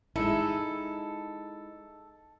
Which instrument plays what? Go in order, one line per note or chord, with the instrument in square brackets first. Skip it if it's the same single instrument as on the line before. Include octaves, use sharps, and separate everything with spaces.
[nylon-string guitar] G#3 D#4 E4 [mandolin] A4